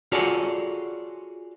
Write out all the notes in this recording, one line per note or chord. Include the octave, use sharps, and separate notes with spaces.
F4 F#4 G#4 A4 C#5 D5